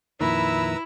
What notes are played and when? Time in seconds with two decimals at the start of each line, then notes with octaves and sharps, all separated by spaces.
0.21 F2 A#2 D#3 E4 B4 A#5 E6